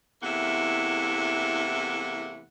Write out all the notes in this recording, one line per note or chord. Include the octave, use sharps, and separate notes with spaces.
E2 C3 A3 A#3 E4 F#5